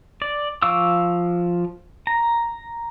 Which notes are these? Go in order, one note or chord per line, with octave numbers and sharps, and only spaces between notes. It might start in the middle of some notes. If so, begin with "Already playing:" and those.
D5
F3 F5 C#6 D6 E6
A#5